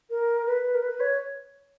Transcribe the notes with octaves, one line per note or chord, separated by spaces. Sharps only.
A#4
B4
A#4
B4
C#5